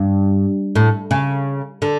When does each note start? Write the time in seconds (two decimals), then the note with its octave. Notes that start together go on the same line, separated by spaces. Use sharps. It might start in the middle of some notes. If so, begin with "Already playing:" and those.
Already playing: G2
0.75 A2
1.11 C#3
1.82 D3